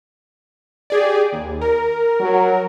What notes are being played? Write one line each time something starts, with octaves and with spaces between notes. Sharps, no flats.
G4 G#4 D5
D#2
A#4
F#3